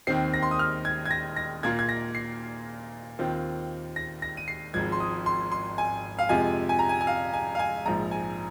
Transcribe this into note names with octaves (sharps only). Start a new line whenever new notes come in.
D#2 D#3 C4 C7
A#6
C6
D#6
F6
G#6
G#6
A#6
A#6
A#2 A#3 F4 G#6
G#6
A#6
C7
D#2 D#3 C4 F4
A#6
A#6
D#7
C7
G#1 G#2 F3 G#6
C6
D#6
C6
C6
G#5
F5
F2 C3 G#3 F4 G#5
G#5
A#5
G#5
G#5
F5
G#5
F5
G#5
A#1 G#2 F3 A#5
G#5